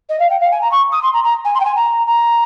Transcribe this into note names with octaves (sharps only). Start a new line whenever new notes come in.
D#5
F5
G5
F5
G#5
A#5
C#6
D#6
C6
A#5
A#5
G#5
C6
G5
G#5
A#5
A#5